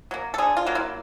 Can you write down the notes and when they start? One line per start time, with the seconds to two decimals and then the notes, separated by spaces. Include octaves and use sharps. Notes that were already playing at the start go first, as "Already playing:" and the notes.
0.11 F#3 A#3
0.34 A4
0.38 D3 G#4
0.57 F4
0.67 F#3 A#3
0.75 E4